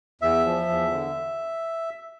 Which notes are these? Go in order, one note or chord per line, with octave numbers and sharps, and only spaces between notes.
E2 E5
F3
E2
D3